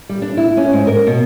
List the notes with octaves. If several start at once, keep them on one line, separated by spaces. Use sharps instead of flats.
G3
D4
E4
C#4
G#2
A#4
B2